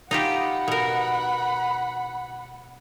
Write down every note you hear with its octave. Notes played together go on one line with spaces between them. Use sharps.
D#4 F4 G4 F#5 B5
B2 A#4